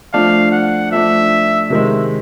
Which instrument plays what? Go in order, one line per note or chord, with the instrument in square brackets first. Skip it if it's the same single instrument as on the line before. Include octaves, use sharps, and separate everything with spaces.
[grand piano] F3 A3 D4 [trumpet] F5
[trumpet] F#5
[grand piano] F3 A3 D4 [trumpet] E5
[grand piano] C3 D#3 G#3 [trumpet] E5